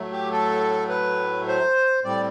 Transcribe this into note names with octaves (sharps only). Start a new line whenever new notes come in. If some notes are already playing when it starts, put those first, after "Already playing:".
Already playing: A2 F#3 A3
G4
A4
B4
C5
A2 G3 C4 D5